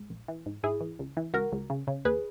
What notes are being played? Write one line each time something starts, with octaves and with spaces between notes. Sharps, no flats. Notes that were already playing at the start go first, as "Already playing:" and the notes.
Already playing: G#2
A#1
E3
G#2
G#2 E4 G#4
E3
C#2
E3
C#2 F#4 A#4
C#2
C#3
C#3
D#2 G#4 B4